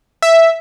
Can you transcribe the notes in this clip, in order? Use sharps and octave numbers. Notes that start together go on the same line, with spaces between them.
E5